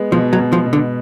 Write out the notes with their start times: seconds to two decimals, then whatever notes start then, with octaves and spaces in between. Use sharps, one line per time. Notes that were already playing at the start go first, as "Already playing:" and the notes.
Already playing: G#3 B3
0.12 B2 F3
0.33 F#3
0.39 B2
0.53 F3
0.66 B2
0.73 D3